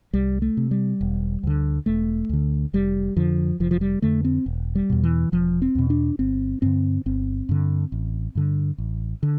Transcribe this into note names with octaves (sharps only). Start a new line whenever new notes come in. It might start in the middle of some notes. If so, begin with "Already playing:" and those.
C2 G3
A3
C3
G3
E1
D2 D3
E1 A3
D2 D3
F1 G3
F2 D3 F3
F1 F3
F3
G3
F2 D3 A3
C4
E1
G3
E2 B2
E3
E1 F3
C4
E2 B2
D4
G1 C4
G2 D3 C4
G1 C4
G2 D3
A1
G2 D3
A1
D3